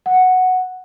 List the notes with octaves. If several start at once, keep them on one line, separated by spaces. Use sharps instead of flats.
F#5